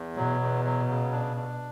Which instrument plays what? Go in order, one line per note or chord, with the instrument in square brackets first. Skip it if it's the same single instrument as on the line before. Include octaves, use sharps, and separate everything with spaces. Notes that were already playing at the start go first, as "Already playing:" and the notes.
Already playing: [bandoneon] E2
[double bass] B2 [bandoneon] F#3
[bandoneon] E2
F#3
C#3
D4
D4